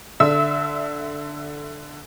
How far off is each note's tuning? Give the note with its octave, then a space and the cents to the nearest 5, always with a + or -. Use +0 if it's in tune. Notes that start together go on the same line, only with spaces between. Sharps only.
D3 +0 E5 +15 E6 -20